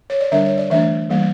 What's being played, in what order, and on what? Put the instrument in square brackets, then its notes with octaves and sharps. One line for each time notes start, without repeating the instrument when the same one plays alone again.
[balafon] C#5
D5
D3 G3 D4 E5
C#5
D5
E3 A3 D4 E5
E3 G3 A#3